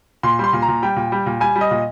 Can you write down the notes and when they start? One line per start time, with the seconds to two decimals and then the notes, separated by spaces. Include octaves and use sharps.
0.23 A#2 C6
0.39 G3 C6
0.53 A#2
0.62 A#5
0.68 A#2
0.82 G3 G5
0.96 A#2
1.12 G3
1.26 A#2
1.40 G3 G#5
1.56 G3
1.61 D#5
1.71 A#2